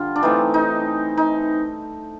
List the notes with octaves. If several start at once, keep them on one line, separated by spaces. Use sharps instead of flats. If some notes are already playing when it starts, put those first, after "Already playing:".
Already playing: D3 G3 F4
D4
E3 A3 C4 D#4
D#4
D#4